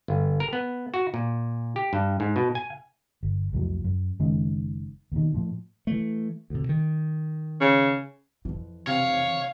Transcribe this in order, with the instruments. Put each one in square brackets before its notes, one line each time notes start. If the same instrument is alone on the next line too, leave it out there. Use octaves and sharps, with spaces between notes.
[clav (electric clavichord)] G1
A#4
B3
F#4
A#2
G4
G2
G#2
B2
G#5
[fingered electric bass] G1
C2 F2 A2 F#3
F#2
F#1 D#3 G#3 C#4
D#2 B2 D#3
A2 F3
[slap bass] E3 A3
D2 C3
D#3
[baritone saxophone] C#3
[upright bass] F2 E3
[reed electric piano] C3 [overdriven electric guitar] C#5 [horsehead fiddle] F5